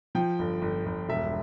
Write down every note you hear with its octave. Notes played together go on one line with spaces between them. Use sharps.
F3 G5
G1
G1
G1
E1 E5